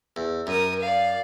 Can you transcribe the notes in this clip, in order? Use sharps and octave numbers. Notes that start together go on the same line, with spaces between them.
E2
F#2 A#4 D#6
D5 F5